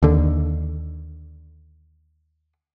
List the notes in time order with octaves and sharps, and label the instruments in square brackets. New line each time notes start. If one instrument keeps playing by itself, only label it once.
[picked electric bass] D#2 D3